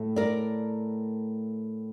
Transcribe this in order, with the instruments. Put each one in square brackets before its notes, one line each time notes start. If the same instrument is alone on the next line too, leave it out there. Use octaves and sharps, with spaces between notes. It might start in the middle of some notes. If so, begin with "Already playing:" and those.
Already playing: [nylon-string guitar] A2 A3
A#4 D5